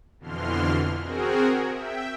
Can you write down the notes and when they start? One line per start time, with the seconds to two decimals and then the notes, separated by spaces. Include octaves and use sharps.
0.19 F2 B2 D3 E3 C6 F6
1.00 C4 F#4 G#4 A#4
1.70 E5 G5